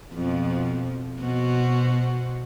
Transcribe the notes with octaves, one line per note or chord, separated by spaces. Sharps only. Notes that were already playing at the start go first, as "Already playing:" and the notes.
F2 B2 F3
B2 F#4 C5